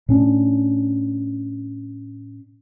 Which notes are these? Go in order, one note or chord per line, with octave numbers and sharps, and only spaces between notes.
A2 C#4 D4